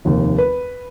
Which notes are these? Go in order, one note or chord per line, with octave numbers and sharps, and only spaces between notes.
F1 D#2
B4